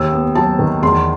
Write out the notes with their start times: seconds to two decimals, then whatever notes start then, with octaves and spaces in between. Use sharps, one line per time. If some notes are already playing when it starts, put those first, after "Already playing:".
Already playing: D#2 E6
0.12 B3
0.35 F#3 A5
0.59 D#3
0.83 E2 C6